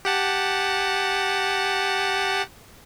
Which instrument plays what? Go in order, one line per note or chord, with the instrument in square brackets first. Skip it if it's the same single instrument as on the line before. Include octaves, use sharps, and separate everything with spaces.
[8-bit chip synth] G4 F#5 A5